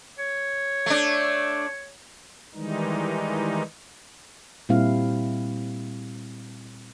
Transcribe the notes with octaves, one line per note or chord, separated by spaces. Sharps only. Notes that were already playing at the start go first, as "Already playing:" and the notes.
C#5
A3 D4
D#3 E3 G3 G#3 D#4
A#2 G3 C4 E4 F5